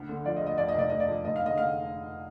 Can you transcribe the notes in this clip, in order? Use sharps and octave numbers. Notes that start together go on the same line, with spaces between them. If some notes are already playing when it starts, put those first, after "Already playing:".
Already playing: D2
D3
F3 D5
D#5
D2
D#5
F2 D5
D#5
F1 D5
F1 D#5
D5
F2
F1 D#5
F5
D3 D#5
D3 F5